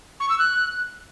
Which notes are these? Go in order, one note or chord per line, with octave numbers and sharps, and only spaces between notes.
C#6
E6
F#6